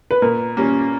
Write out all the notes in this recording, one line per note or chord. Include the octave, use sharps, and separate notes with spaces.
B4
A#2 A#4
G3 A#3 C#4